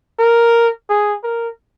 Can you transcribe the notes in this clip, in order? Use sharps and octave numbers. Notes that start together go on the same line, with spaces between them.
A#4
G#4
A#4